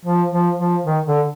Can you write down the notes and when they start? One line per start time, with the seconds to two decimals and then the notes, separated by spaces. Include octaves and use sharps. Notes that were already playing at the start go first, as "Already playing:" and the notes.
0.05 F3
0.31 F3
0.58 F3
0.85 D#3
1.06 D3